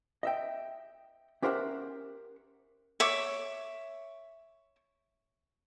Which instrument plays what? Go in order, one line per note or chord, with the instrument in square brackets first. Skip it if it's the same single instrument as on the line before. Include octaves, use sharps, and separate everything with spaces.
[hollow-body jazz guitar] D#5 E5 G5
C#4 G4 A#4 C5 E5 F#5
[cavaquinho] C#5 E5 D6